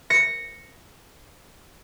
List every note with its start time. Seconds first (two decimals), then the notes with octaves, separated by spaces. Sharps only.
0.10 A#6 C#7